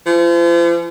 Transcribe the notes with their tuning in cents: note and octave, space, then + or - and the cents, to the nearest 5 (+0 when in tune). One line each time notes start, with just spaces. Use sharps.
F3 -40